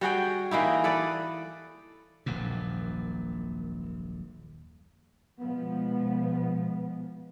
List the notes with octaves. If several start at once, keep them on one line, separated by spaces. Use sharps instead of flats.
G3 F#4 G#4 G5
E3 A#3 D#4 E4
A4 B4 D5
D#1 A#1 F#2 A#2
B2 F3 G#3 B3